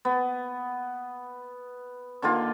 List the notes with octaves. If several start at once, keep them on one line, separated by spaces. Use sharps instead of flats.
B3
D3 D#3 A#3 F4